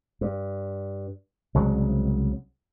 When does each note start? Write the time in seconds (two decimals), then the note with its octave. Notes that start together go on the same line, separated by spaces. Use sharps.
0.21 G2
1.54 C2 C#3 F#3 G#3